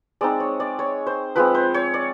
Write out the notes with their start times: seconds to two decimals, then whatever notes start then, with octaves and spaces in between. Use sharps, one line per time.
0.21 G#3 C4 D#4 D5
0.40 C#5
0.60 D5
0.79 C#5
1.07 C5
1.36 F3 G#3 C4 B4
1.55 C5
1.74 C#5
1.94 D5